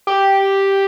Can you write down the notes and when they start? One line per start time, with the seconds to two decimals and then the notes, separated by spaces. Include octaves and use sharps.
0.07 G4